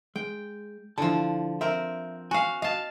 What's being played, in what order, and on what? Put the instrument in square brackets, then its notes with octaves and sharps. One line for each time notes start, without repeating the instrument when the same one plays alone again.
[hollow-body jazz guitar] G#3 [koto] G5
[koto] D3 F3 [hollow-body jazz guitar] E4 A5
[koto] C4 A#4 [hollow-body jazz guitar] E5
[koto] F#4 F5 [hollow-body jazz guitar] G#5
[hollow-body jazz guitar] D#5 [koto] F5 A5